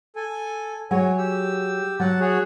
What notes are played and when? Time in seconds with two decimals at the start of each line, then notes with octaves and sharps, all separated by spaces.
0.16 A4 G#5
0.91 F#3 G#4 C#5 G#5
1.18 G4 E6
2.00 F#3 F#5 A5
2.20 F#4 G#4 C#5